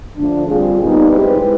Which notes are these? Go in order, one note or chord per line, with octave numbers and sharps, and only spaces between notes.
D3 F3 A3 D4
D3 G3 C4 F4 G#4
A#2 G3 B3 D#4
G#3 C4 E4 G4 B4